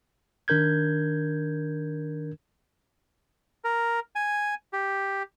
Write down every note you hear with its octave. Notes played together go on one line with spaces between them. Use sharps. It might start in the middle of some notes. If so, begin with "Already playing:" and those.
D#3 D4 A#4 G6 G#6
A#4
G#5
G4